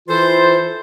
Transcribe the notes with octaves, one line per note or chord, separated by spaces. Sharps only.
E3 E4 F4 A4 C5